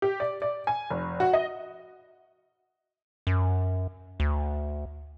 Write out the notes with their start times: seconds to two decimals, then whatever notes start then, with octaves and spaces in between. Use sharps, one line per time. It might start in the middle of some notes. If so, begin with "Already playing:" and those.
0.02 G4
0.20 D5
0.42 D5
0.67 G#5
0.90 F1
1.20 F#4
1.33 D#5
3.27 F#2
4.20 D2